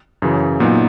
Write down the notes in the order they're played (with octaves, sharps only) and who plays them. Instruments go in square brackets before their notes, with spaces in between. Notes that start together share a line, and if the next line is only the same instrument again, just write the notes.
[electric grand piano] F#2 C#3 E3
A#2 F#3 B3 D#4